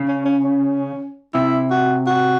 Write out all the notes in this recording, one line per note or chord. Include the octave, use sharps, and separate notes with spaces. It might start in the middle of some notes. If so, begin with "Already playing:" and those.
Already playing: C#3
C#4
C#4
C#4
C3 E4
F#4
F#4